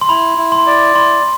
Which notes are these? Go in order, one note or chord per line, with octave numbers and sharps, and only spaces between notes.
C6
E4 B5
E4
C6
D5
E4 C6